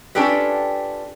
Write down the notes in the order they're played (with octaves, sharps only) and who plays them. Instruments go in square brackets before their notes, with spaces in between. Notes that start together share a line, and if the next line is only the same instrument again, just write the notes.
[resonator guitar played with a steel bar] C#4 D4 F4 G4 A4 B4